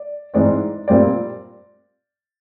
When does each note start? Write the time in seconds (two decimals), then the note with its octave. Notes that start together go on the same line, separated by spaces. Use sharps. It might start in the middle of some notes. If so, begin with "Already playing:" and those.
Already playing: D5
0.34 G#2 E3 G#3 C4 D5
0.88 A#2 G3 C4 D5